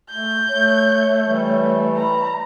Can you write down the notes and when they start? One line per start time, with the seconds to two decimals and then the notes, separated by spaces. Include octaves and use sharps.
0.10 A3 G6
0.49 A3 C#5
1.25 E3 G3
1.97 A#5 B5